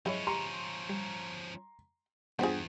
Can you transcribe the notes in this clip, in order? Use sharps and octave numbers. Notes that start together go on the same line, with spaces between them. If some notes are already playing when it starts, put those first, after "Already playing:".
F3 F#3 G#3 C#4 E4 C#5
G4 A#5 C6 C#7
G3
E2 G2 B3 F4 G#4 C5 G5